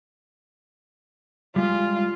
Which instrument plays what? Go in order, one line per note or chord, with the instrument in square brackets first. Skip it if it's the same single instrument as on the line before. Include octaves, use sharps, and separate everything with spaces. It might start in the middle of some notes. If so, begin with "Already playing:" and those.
[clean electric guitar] G3 G#3 [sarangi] F4